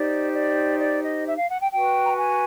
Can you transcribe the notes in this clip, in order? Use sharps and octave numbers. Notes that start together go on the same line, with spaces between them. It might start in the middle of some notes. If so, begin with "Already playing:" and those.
Already playing: D#4 G4 C5 D5
D5
D5
D#5
E5
F5
F#5
G5
F#4 B4 G5
A#5
A5
G#5